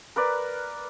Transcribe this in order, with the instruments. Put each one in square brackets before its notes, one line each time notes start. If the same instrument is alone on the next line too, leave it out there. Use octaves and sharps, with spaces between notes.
[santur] A#4 B4 D5